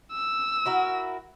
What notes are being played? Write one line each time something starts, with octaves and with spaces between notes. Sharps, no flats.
E6
E4 F#4 A#4